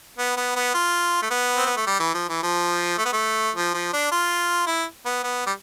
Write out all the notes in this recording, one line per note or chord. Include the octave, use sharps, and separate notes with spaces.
B3
B3
B3
F4
A3
B3
C4
B3
A3
G3
E3
F3
E3
F3
A3
B3
A3
F3
F3
D4
F4
E4
B3
B3
G3